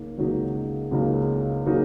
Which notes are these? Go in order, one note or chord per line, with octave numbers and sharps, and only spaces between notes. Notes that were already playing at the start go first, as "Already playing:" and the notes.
Already playing: C#2 C#3 A#3 D#4
C#2 C#3 F#3 A#3 D#4
C#2 C#3 F#3 A#3 D#4
C#3 F#3 A#3 D#4